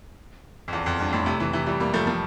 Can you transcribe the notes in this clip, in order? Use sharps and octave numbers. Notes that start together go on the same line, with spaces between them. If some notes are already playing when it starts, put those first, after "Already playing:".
F2
E2
F2
E2 G2
F2 A2
A2 C3
C3 E3
C3 E3
E3 G3
G3 A#3
F3 A3
F3 A3